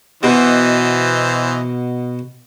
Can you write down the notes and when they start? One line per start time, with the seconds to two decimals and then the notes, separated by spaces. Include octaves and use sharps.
0.23 B2 E3 C5 D#5